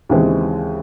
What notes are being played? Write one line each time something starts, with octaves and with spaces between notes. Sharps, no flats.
D#2 C#3 E3 G#3 C4